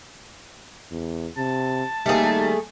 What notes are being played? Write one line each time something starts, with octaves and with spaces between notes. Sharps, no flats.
E2
C3 A5
D#2 G3 A3 D#4 G#4